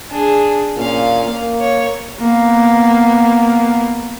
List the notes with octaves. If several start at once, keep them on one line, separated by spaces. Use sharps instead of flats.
D4 G#4
A#2 C#4 F5
A#3
C#5
A#3 B3